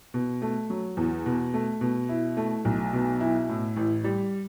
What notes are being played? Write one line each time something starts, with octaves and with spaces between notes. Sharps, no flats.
B2
A3
F#3
E2
B2
A3
B2
E4
A3
B1
B2
E4
A2
A1
G3